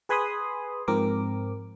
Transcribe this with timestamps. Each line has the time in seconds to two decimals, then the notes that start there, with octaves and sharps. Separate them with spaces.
0.09 G#4 B4 G#5 B5 C6 D#6
0.88 G#2 F3 C4 A#4 D6